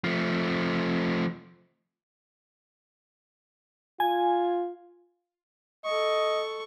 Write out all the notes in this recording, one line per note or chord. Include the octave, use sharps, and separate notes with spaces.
F3 A3
F4 G#5
A4 D#5 C#6